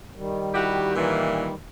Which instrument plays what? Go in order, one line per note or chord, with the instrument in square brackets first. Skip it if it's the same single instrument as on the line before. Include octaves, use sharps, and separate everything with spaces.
[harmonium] D#3 G3
[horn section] E4 F#4 G4
A#2 E3